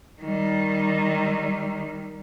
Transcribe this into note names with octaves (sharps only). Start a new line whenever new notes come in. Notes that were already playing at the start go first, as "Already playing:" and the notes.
D#3 G3